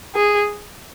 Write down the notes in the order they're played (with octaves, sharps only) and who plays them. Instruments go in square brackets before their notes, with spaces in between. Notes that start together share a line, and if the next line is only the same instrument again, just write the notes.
[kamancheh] G#4